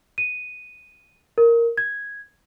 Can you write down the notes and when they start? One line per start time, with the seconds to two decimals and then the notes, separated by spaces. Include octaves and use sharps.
0.18 D#7
1.38 A#4
1.78 G#6